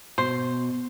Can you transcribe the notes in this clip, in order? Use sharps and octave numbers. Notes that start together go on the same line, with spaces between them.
B2 C5